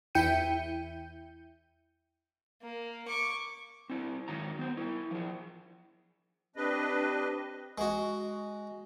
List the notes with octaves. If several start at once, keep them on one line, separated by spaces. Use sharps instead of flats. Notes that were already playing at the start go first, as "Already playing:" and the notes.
E2 E4 G5 G6 C#7 D#7
A#3
C#6 D6
C4 E4
G#2 D#3 F#3 A#5
B3 C5
E4 A#4
F3 G#4
C4 D4 G4 B4 D#5
G#3 F#4